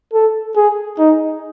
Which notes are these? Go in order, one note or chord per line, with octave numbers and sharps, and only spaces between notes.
A4
G#4
D#4